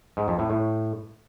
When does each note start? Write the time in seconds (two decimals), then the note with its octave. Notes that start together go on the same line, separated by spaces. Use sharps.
0.17 G#2
0.28 F2
0.39 A2
0.50 A2